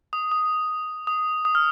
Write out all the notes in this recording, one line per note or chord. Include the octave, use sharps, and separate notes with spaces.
D#6
D#6
D#6
D#6
F6